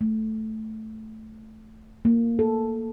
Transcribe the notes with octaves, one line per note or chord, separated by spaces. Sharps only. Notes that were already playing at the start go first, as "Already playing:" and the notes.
A3
A#3
A4